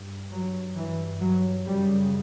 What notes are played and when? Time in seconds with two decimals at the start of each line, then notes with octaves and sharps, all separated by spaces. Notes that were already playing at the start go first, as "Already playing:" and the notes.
Already playing: G2
0.32 F#3
0.76 G2 E3
1.21 F#3
1.66 F#2 C#3 G3